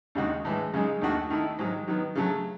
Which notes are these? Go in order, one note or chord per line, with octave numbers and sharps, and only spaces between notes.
D#2 C#3 G#3 D#4 F#4
A2 E3 G#3
F#2 C#3 G#3 D#4
D#2 D#3 A3 D#4 F#4
D#3 A3 E4
G#2 D#3 F#3
D#3 F#3 B3
C#3 F#3 A3